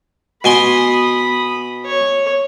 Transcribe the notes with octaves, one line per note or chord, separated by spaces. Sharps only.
B2 G#5 B5 C6 D#6
C#5